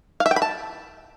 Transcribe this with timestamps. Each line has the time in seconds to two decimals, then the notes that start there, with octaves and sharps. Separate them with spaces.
0.20 F5
0.26 E5
0.31 G5
0.36 B5
0.42 A5